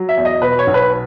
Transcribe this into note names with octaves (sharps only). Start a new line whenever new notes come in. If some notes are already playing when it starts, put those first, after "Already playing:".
Already playing: F#3
E5
E2
D#5
B2 B4
C#5
B1
B4